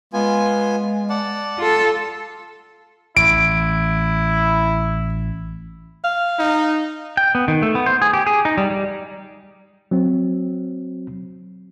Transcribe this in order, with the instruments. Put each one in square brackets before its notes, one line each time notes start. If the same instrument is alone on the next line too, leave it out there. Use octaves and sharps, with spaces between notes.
[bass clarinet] G#3 [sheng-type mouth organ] B3 F4 G#5
[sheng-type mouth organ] D5 F#5 A5
[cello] F4 A4
[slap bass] A1 [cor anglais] E4 [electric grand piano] D7
[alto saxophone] F5
[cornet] D#4
[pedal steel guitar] G5
B3
D#3
A3
B3
C5
G#4
G4
G#4
D#4
G3
G3
[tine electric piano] F#3 C4